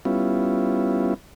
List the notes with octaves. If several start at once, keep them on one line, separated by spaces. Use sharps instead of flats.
G3 B3 C#4 E4 F4